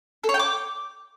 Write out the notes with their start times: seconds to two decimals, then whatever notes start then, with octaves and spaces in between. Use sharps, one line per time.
0.24 A4
0.29 C#5
0.34 G5
0.39 D6